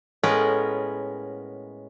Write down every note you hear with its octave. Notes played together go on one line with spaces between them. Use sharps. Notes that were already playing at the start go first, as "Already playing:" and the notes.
A2 G#3 B3 C#4 A#4 B4